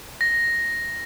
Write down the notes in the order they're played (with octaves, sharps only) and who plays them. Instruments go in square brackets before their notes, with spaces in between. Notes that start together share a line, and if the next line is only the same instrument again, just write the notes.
[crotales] A#6